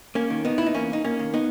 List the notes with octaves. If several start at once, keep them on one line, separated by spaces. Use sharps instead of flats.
A#3 C#4
D#3
B3 D#4
E4
D#4
E2 A#3 C#4
D#4
A#3 C#4
D#3
B3 D#4